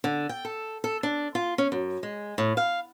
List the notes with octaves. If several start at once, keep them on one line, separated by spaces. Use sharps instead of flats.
D3
G5
A4
A4
D4
F4
C#4
F#2
G#3
A2
F5